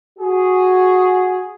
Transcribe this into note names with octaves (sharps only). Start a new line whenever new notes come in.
F#4 G#4